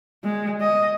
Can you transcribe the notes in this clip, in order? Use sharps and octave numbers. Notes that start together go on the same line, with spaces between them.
G#3
D#5